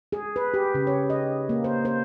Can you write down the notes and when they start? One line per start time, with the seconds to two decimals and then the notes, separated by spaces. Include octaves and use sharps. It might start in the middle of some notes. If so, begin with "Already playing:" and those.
0.12 G#4
0.36 B4
0.54 G4
0.74 C#3
0.87 C#5
1.10 D#5
1.49 A#3
1.64 C5
1.85 C5